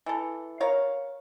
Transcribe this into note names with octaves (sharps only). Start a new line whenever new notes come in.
E3 A4
A#4 C#5 F5